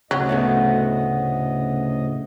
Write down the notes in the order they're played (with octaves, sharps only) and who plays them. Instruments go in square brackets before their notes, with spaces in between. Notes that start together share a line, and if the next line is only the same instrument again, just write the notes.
[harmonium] D2 A2 D#5 [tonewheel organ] C#3 [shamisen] F#3
[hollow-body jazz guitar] A3 B3 F#4